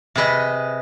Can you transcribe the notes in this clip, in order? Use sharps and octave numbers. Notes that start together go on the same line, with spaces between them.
C3 G#4 B4 D#5